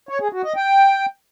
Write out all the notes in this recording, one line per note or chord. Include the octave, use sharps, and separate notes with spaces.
C#5
G#4
F#4
D#5
G5